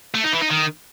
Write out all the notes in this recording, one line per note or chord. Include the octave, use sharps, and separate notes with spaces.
A3
D#4
E3
D#4
D#3